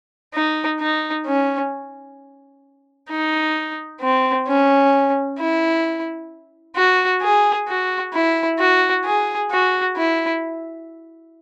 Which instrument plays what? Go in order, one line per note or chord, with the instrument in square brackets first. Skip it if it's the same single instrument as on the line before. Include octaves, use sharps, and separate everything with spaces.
[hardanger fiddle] D#4
D#4
C#4
D#4
C4
C#4
E4
F#4
G#4
F#4
E4
F#4
G#4
F#4
E4